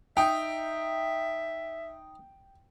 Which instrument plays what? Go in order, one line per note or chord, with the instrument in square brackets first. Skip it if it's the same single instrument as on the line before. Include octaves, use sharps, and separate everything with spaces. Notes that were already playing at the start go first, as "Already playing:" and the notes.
[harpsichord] D#4 [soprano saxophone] E5 [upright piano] G5